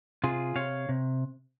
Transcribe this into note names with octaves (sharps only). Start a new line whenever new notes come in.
C3 F4 G#4
C3 C#5 F5
C3